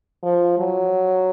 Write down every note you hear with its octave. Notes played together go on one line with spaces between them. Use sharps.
F3
F#3